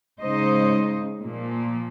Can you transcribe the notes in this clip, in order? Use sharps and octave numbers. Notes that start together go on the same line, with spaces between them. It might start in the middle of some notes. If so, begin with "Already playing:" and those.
C#3 G#3 D#4 C5 D#5
A#2 F3 A#3